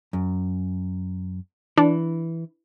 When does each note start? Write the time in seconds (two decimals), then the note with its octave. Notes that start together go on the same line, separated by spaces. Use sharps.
0.13 F#2
1.78 E3 D4